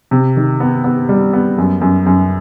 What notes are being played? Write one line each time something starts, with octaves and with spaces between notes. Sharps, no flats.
C3
D#3
B3
B3
G3
B3
F#2
F#2
F#2